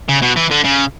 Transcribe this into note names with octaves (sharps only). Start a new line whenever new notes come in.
C#3
B2
E3
D3
C#3